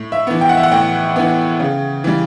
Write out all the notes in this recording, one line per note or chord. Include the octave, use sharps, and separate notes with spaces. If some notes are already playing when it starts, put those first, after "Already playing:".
Already playing: A2
E5
E3 B3
G5
F#5
E5
F#5
A2 G5
E3 B3
C#3
E3 G3